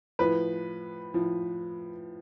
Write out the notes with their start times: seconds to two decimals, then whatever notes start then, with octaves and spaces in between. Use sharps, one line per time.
0.19 A2 F3 B4
1.14 A2 F3